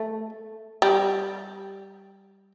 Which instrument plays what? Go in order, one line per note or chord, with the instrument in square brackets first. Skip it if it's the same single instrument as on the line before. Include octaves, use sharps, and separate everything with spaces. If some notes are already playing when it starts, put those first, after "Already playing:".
Already playing: [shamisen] A3
G3